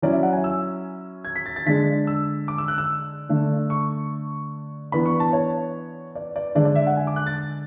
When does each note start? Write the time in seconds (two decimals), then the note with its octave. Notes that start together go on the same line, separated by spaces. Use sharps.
0.02 F#3 C#4 E4 D5
0.13 E5
0.23 F#5
0.33 G#5
0.44 E6
1.25 G#6
1.36 B6
1.46 A6
1.56 A6
1.66 D3 G#3 D4 B6
2.07 E6
2.48 D6
2.58 E6
2.68 F#6
2.78 E6
3.29 D3 A3 D4
3.70 C#6
4.92 E3 B3 D4 B5
5.06 C#6
5.20 A5
5.33 C#5
6.15 D5
6.36 D5
6.55 D3 G#3 D4 D5
6.65 D5
6.75 E5
6.87 F#5
6.97 G#5
7.07 D6
7.16 F#6
7.26 A6